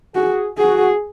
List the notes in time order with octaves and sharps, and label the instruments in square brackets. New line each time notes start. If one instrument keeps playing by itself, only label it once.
[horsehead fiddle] F#4 [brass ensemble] G#4
[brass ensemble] F#4 [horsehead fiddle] G#4